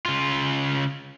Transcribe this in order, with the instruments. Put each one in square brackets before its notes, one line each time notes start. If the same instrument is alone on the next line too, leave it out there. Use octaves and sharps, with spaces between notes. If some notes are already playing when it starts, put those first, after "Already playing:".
[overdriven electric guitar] C#3 F4